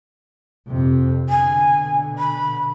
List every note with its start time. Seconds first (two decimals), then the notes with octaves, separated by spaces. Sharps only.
0.68 F2 C3
1.29 B2 D3 G#5
2.19 B5